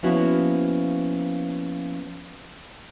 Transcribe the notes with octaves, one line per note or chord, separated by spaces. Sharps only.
F3 A#3 B3 C#4 E4 F#4